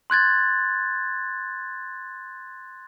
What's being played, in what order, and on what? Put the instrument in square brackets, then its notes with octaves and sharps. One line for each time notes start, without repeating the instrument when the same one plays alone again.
[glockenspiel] C6 F#6 G#6 A6